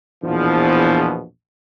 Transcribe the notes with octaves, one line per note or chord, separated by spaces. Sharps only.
A#1 E2 B2 E3 F3